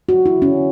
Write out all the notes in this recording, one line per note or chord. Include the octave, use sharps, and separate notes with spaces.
F#4
F#3
E4
D3
C#4